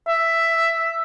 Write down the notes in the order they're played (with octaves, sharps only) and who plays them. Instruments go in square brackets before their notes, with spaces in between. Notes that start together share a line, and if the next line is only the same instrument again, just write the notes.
[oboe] E5